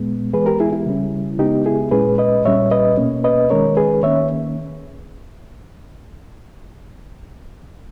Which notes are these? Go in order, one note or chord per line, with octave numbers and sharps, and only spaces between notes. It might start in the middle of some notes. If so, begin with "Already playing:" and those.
Already playing: A#2 G#3 B3
E3 G#3 B3 G#4 B4
G4 A#4
E4 G#4
E4
C#3 G3 C#4
C#3 G#3 B3 D#4 G4
E4 G#4
A#2 G#3 C#4 G#4 B4
B4 D#5
A#2 G3 C#4 C#5 E5
B4 D#5
B2 A#3 C#4
B4 D#5
D#3 G#3 C#4 A#4 C#5
G#4 B4
D#3 A#3 C#4 C#5 E5